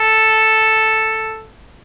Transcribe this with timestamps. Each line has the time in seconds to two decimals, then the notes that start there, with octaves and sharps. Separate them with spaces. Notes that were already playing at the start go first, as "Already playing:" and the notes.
Already playing: A4